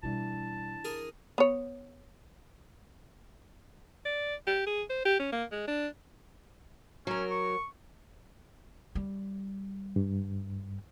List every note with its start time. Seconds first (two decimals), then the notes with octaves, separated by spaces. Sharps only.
0.03 B2 E3 G3 D4 E4 A5
0.85 G#4 A#4
1.38 B3 C#5
4.05 D5
4.47 G4
4.67 G#4
4.90 C5
5.05 G4
5.19 C#4
5.32 A#3
5.52 G#3
5.68 D4
7.07 F#3 C#4 A#4
7.30 C#6
8.95 G3
9.96 G2